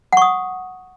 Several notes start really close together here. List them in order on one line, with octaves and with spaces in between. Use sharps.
F#5 C#6 D#6